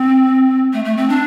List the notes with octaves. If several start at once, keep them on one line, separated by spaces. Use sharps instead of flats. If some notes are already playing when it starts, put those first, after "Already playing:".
Already playing: C4
A3
A3
C4
D4